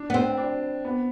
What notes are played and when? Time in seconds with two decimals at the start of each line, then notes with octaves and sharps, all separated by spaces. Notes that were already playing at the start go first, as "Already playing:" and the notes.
Already playing: D4
0.10 B3
0.14 C4
0.37 D4
0.85 B3